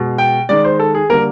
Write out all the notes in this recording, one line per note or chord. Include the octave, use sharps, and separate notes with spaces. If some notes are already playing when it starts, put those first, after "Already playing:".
Already playing: B2 G#3
G5
D#3 G#3 D5
C5
A4
G#4
D3 G3 A#3 A#4